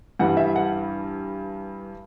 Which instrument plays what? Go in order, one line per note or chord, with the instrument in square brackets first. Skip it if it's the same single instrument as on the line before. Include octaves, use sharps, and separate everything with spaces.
[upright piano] G2 E3 G3 F#5
E5
F#5